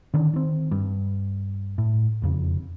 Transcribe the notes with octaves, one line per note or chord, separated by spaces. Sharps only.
D3 D#3 C#4 D4
D#3 C4
G2
A2
E1 F2 C#3